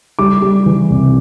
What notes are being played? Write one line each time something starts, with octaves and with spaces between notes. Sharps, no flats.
G3 D6
G3
E3
C2